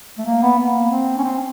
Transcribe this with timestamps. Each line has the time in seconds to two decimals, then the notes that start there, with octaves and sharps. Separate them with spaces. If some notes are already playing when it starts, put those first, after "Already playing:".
0.18 A3
0.26 A#3
0.43 B3
0.59 A#3
0.91 C4
1.18 C#4
1.24 C4